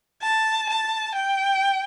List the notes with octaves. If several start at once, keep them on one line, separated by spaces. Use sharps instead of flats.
A5
A5
G5